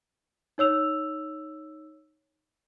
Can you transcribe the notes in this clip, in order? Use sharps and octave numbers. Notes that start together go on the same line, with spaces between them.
D#4 C#5 E6 F7